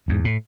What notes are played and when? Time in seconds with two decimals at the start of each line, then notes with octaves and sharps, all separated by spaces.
0.08 E2 G#2
0.25 A2